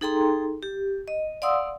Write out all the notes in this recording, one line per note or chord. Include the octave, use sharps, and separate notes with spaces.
D#4 G#4 A4 G5 A#5 C6
G4
D#5
D5 F5 F#5 C6 D#6 E6